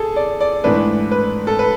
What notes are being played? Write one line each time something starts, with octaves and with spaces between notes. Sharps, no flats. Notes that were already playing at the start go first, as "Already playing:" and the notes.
Already playing: G#4 A4
D5
D5
G#2 E3 A3 D4 B4
B4
A4
B4